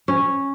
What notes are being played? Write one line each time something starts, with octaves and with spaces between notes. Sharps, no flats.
C#4